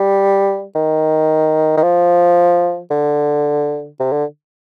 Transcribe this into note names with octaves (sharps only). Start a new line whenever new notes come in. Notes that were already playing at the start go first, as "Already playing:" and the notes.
Already playing: G3
D#3
D#3
F3
D3
C3
D3